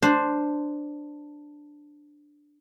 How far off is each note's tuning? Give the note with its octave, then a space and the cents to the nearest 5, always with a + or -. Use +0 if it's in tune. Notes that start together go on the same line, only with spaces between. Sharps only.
D4 +5 C5 +0